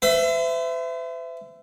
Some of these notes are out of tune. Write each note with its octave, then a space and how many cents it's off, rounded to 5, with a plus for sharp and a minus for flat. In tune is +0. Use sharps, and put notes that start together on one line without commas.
C5 -45 E5 +15